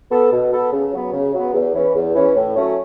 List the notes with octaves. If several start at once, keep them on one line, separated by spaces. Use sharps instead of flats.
B3 A4
B2
B3 A4
C#3
F#3 B3
C#3
F#3 B3
E2
E3 C#4
E2
E3 C#4
A2
F#3 A3 C#4